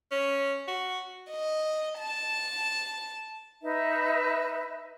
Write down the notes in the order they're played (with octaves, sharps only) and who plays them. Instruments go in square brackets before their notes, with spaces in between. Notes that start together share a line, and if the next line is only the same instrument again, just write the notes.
[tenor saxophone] C#4
F#4
[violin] D#5
A5
[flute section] D#4 B4 E5